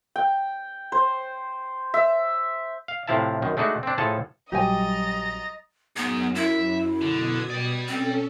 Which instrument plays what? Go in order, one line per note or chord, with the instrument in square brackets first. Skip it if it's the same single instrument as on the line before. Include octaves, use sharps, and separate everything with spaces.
[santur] G5
C5
E5
[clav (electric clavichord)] F5
A2 C3 F3 E4 F5 A5
F#2 D#3
G#3 A3 D4 D#4 F#4
C4 D4
A2 F3 G#4 A4 C#5 A5
[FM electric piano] A#1 F#3 G3 [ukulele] G4 G#5 [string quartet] D#5 A6 [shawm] A#5
[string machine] F#2 [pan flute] B3 [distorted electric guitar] D#4 G#4
[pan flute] E4 [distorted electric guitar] E5
[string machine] B2 D#6 G#6 [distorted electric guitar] D3
[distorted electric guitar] D5 G5
[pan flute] C4 [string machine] C#4 A4